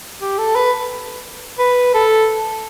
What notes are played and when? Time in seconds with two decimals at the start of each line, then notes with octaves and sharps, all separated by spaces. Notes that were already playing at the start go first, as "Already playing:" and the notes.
0.21 G4
0.38 A4
0.56 B4
1.59 B4
1.94 A4